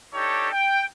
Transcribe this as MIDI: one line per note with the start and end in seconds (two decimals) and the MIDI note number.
0.14 0.49 62
0.14 0.49 63
0.14 0.49 67
0.14 0.49 69
0.14 0.49 73
0.52 0.84 79